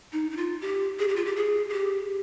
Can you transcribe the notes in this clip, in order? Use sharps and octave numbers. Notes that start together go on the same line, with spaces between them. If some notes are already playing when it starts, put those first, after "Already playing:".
D#4
D#4
F4
G4
G#4
G4
F4
G4
G#4
G#4
G4